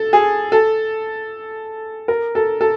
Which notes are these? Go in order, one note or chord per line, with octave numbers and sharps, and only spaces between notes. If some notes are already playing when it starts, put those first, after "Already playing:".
Already playing: A4
G#4
A4
A#4
A4
A4